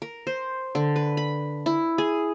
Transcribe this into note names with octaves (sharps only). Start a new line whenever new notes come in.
A#4
C5
D3
B4
B5
E4
G#4